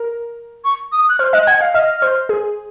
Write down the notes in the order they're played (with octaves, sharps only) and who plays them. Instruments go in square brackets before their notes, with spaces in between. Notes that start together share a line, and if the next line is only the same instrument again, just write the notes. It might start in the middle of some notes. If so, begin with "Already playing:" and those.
Already playing: [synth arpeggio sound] A#4
[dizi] C#6
D#6
F#6
[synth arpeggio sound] C5 [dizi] F6
[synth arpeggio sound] D#5 [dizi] F#6
[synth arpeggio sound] F#5 [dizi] G#6
[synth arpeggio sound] F5
[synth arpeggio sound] D#5 [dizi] F6
[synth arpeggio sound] C5
G#4